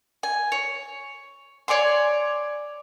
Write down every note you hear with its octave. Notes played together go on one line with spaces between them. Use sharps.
G#5
C#5
C#5 D5 G#5 C6